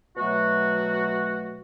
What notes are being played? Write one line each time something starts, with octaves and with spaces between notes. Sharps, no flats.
B2 F#3 A3 F#4